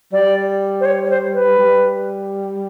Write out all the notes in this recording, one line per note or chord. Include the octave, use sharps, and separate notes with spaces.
G3 D5
C5
C#5
C#5
C5
B4
G3